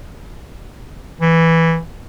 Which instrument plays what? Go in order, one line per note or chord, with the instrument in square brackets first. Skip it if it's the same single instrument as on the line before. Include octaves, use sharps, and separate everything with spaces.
[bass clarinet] E3